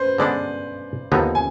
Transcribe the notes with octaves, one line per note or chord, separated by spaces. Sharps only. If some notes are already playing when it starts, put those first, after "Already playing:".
Already playing: B4 C5
D3 G#3 B3 D4 D5
D#2 D3 F3 B3 D#4
G#5